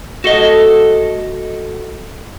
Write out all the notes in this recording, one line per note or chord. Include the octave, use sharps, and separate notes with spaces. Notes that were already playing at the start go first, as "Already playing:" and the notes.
A3 F#4 A4 D#5